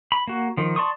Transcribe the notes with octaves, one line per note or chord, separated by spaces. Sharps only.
B5
A#3 F#4
D#3 F3
D5 A5 C6 C#6 D#6